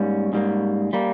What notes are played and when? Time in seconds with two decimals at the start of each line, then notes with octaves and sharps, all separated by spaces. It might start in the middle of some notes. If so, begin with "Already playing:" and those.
Already playing: G#2 G3 A#3 C#4
0.33 G#2 G3 A#3
0.93 G3 A#3